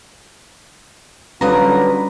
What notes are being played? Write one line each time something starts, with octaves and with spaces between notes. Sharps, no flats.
D3 F#3 G3 C#4 F4 B4 A#5 D#6